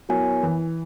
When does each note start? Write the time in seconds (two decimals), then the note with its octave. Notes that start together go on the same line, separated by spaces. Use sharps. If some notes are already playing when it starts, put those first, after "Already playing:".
0.09 F#3 B3 E4 A#4 C#5 G#5
0.43 E3